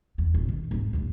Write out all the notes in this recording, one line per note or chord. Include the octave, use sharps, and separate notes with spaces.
E2
F1 A#1
D#3
G#2 G#3
A#1 D#2